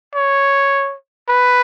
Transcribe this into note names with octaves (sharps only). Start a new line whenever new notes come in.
C#5
B4